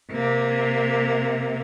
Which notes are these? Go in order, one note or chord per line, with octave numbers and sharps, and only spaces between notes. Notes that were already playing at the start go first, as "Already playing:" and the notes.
C3 A#3